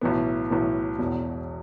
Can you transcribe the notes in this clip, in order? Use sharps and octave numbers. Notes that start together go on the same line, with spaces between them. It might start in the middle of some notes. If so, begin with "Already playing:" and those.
B1 A2 E3 B3
B1 A2 E3 B3
E1 E2 B2